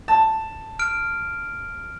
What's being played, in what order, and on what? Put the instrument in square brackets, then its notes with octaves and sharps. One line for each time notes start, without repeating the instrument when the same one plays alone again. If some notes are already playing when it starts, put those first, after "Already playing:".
[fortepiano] A5
[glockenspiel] F6 D7